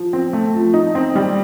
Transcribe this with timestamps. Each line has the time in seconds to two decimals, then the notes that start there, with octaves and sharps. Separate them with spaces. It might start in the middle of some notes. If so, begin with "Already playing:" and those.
Already playing: F3
0.13 C4
0.33 A3
0.54 F3
0.74 D#4
0.95 C4
1.15 G3